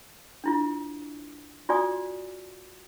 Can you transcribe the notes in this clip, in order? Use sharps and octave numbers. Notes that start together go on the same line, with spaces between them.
D4 E4 F4
F4 F#4 D5 G#5 D#6